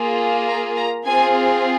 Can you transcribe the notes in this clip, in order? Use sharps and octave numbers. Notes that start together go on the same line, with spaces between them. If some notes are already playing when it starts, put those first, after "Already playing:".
Already playing: A#3 F4 G#4
A#5
A#5
C4 F4 G#4 G#5